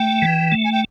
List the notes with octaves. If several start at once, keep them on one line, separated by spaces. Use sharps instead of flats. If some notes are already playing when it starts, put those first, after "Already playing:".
Already playing: A3 G5
E3
A3
G#5
G5